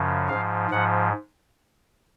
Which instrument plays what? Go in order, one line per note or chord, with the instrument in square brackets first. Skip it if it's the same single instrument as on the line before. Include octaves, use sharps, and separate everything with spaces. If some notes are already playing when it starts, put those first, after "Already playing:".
Already playing: [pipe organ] F#2 C#3 F3
G#2 F3 F5
G#2 F3 F#5